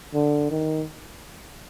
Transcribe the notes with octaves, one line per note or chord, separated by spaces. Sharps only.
D3
D#3